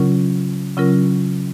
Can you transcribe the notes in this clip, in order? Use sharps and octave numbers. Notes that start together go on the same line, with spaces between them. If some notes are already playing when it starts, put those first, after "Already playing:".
Already playing: C#3 F#3 C#4 F4 A#4
C#3 F#3 C#4 F4 A#4